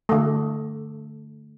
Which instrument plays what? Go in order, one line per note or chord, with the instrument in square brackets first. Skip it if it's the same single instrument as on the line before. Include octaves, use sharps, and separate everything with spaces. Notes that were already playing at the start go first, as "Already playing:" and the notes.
[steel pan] D3 A3